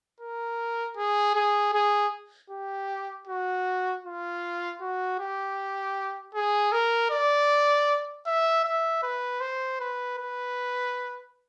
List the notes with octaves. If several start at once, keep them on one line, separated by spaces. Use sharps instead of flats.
A#4
G#4
G#4
G#4
G4
F#4
F4
F#4
G4
G#4
A#4
D5
E5
E5
B4
C5
B4
B4